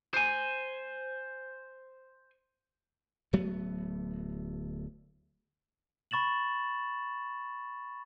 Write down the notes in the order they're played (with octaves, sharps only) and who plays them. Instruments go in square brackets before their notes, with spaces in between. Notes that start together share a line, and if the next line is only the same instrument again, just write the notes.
[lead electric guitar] C5 G#5
[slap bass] D1 F#3 A3 B3
[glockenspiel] B5 C#6 A6 E7 F#7